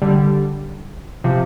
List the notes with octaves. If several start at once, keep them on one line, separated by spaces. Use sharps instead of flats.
D3 G3
C3 F3